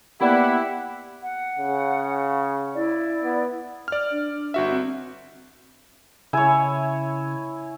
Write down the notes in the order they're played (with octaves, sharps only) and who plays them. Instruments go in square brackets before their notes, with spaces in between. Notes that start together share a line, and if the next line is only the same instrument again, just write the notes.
[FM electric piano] A#3 B3 D5 [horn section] E4 [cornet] G4 [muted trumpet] F#5
[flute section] F#5
[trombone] C#3
[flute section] E4 D5
[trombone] B3
[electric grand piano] D5 F6
[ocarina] D4
[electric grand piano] G1 F#4 E5
[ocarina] C4
[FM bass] C#3 [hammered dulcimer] E4 C#5 [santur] G#5